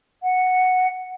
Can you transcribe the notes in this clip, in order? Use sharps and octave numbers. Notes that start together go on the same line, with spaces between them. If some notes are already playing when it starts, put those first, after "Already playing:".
F#5